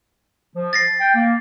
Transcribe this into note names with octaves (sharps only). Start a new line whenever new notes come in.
F3
A6 A#6 C7
G5
A#3